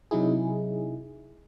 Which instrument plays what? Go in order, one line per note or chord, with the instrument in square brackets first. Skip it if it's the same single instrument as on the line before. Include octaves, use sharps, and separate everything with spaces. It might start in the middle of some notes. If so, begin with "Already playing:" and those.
[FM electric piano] C3 F#3 D#4 E4 G#4